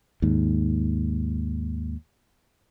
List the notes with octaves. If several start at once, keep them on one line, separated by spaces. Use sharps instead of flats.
D#2 G#2